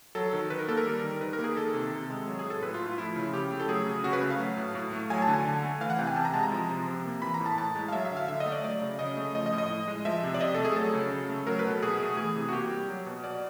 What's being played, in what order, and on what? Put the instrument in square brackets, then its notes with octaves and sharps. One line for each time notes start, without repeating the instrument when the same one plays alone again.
[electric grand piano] F#3 A4
D#3
D#3 B4
A#4
A#3 A4
A#4
G3
D#3
D#3 B4
A#4
A#3
G#4
D#3 A4
C3
C3
G#3
F#3
G#4
A2
A4
A2 B4
F4
A3
F4
F3 E4
C#3
C#3 G4
A3
A4
F#3 G#4
C#3
C#3 F#4
B4
A3
F5
F#3
A2
A2
A3
F#3 G#5
A5
D3
G#5
D3
A3
E3 F5
F#5
C3 G5
G#5
C3 A5
A#5
G#3 A5
A#5
F3
C3
C3
A#3
E3 B5
A#5
A2
A5
A2 A5
G#3
F5
F#3 E5
E5
D3
F5
D3 E5
D#5
A3
D5
F#3 D5
C#3
C#3 D#5
A3
F3 D#5
D#5
A2
D#5
A2
G#3
F3 E5
C3
D5
C3 D#5
A3 A4
G#4
F#3 A4
C#3
C#3
A3
F#3 A#4
B4
B2
A4
B2 G#4
A3
E3 G#4
C3
F#4
A#3 G4
G3
F#3
B2
B2 D5